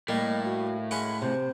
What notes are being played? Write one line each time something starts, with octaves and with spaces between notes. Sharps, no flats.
A2 G3 A#3 D#5
F#4
G#3 C#4 F#5 B5
C3 C5